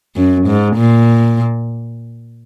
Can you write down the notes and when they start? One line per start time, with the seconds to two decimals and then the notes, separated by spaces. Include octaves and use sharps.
0.16 F#2
0.47 G#2
0.77 A#2